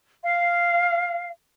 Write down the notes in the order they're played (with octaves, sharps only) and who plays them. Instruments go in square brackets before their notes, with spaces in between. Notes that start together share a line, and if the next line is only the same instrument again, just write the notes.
[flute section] F5